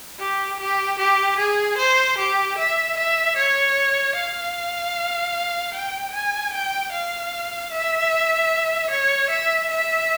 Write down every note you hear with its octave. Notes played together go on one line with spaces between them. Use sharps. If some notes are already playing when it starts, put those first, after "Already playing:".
G4
G4
G4
G#4
C5
G4
E5
E5
C#5
F5
G5
G#5
G5
F5
E5
C#5
E5
E5